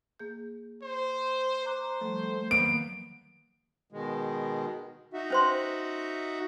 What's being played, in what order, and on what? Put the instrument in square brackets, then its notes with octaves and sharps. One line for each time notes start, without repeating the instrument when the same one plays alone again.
[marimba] A#3 G#4 G6
[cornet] C5
[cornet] C5 [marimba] A#5 D6 F#6
[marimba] F3 G3 [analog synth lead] A3
[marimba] D#3 F#3 [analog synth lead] A#3 [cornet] B3 [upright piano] D7
[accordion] B2 D#3 G#3
D#4 F#4 E5
[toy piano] C#4 C5 C6